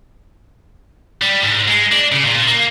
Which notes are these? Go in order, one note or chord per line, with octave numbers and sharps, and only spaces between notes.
G3
G#2
G#3
D4
C#3
A#2
A#3